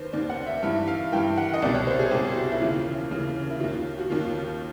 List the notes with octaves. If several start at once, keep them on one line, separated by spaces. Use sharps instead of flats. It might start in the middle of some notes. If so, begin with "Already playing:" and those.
Already playing: D#2 D#3 B4 C5
D#2 D#3 D5
F#5
E5
G2 E3 E5
F5
G2 E3 G5
F#5
D#5
C2 B2 D5
C#5
C5
G#4
C2 B2 G4
F#4
E4
D#2 C#3 E3 F4
D#2 C#3 E3
E4
D#2 D#3 F4
F#4
D#2 D#3 F4